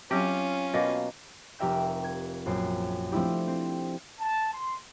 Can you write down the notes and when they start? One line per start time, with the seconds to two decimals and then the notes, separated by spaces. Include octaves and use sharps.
0.11 F#3 C4 C#4 F4 G4
0.74 B2 A#3
1.59 F1 G4 A#4 E5 G5 G6
2.04 G#6
2.46 A#1 F#2 G5 C7
3.12 F3 A3 C4 D4 E4 G4
3.48 C4
4.20 A5
4.53 C6